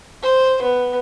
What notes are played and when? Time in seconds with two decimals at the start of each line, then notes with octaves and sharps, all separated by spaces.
0.23 C5
0.62 B3